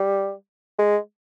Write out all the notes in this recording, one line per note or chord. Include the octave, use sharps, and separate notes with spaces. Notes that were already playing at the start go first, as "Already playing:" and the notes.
Already playing: G3
G#3